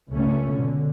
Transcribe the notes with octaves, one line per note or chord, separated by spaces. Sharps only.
C#2 G2 A3 C#4
B2 D3